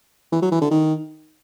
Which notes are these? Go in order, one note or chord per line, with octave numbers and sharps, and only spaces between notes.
E3
F#3
E3
D3
D#3